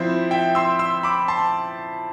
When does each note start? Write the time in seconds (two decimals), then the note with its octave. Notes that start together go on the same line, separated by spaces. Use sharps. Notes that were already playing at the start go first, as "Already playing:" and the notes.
Already playing: F3 C4 E4 C5 E5
0.31 E5 G5
0.55 C6 E6
0.79 C6 E6
1.03 B5 D6
1.28 A5 C6